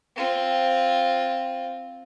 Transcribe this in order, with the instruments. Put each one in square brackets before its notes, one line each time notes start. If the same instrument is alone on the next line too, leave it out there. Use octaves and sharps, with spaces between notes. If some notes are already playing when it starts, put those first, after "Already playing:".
[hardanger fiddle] C4 F4